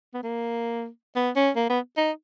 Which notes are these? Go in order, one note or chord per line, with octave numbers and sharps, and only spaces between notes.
B3
A#3
B3
C#4
A#3
B3
D#4